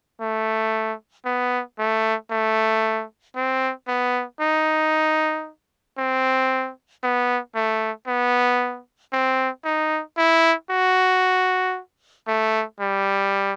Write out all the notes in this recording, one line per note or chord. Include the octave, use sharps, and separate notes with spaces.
A3
B3
A3
A3
C4
B3
D#4
C4
B3
A3
B3
C4
D#4
E4
F#4
A3
G3